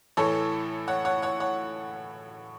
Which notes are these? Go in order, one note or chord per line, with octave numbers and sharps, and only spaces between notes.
A2 E3 A3 A4 C#5
C#5 F#5
C#5 F#5
C#5 F#5
C#5 F#5